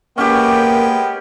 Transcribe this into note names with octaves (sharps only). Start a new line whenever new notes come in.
G#3 A#3 B3 C#4 G4 G5